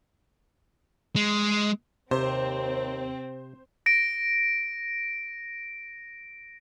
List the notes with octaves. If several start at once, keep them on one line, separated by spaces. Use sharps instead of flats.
G#3
D#2 C3 C4 C5
A#6 D7